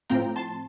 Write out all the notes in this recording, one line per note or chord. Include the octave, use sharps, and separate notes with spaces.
A2 F3 C4 G5 A#5
A5 C6